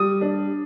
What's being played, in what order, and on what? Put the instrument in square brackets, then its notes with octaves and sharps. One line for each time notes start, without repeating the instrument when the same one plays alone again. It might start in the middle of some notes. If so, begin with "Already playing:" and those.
Already playing: [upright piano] G3 [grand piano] D#6
[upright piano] D4